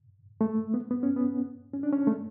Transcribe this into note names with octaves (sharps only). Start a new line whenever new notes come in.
A3
B3
B3
C#4
B3
C#4
D4
C#4
A3